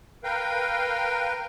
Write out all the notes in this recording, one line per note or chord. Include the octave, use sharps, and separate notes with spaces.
A#4 B4 F5 G5